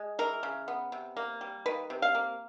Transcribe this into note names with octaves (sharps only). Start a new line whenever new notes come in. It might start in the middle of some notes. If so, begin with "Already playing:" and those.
Already playing: G#3
E3 A#4
C#3
B3
C3
A#3
G3
D#3 B4
C3
F5
A#3